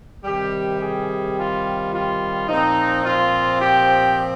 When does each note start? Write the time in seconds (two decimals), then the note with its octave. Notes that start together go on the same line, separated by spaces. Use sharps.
0.24 C3 D#3 G3 G4
0.80 G#4
1.37 F4
1.92 F4
2.47 A#2 F3 C4 D#4
3.04 F4
3.59 G4